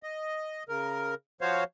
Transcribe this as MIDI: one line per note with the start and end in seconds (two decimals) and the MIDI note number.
0.03 0.63 75
0.69 1.14 49
0.69 1.14 70
1.41 1.64 53
1.41 1.64 66
1.41 1.64 72
1.41 1.64 73
1.41 1.64 77